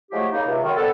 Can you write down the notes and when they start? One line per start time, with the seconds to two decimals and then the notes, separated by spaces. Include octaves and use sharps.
0.12 F3 F#3 G#3 A3 E4 G4
0.31 C#3 G#3 A#3 D#4
0.46 C#2 C3
0.63 F#2 D#3
0.76 B3 C4 D4 A4